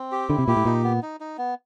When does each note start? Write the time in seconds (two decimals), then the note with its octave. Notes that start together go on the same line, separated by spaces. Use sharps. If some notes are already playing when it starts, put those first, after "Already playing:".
Already playing: C4
0.12 G4
0.29 D3 E4
0.38 C3
0.48 A#2 G4
0.57 A2
0.65 A#2 D#4
0.84 B3
1.02 D#4
1.20 D#4
1.38 B3